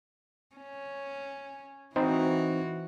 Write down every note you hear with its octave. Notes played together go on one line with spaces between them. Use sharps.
C#4
E3 C4 D#4 F#4 C5